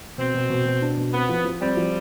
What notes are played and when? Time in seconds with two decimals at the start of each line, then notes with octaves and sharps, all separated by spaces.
0.18 B2 C4
0.34 B2
0.50 B2
0.65 B2
0.82 D4
0.97 B2
1.13 B3 C4
1.29 F3
1.45 F3
1.61 G3 C4
1.77 F3